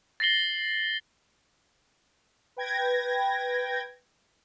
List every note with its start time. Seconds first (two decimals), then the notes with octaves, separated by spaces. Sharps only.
0.20 A6 A#6 C7 F#7 G7
2.57 B4 G5 G#6 A#6